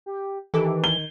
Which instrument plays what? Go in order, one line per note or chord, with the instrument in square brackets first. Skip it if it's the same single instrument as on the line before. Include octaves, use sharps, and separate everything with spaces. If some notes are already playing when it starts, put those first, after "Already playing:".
[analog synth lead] G4
[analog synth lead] D#3 [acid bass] E3 [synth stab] G4 A4 D6
[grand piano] G7